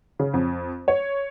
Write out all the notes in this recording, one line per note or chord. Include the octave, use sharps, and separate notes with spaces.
C#3
F2
C#5